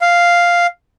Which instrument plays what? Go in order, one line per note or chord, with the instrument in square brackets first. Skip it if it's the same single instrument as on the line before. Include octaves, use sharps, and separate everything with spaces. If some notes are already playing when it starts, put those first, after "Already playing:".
[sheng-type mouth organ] F5